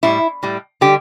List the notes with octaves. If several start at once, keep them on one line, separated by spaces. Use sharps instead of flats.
A2 G3 E4
A2 G3
D3 G3 G4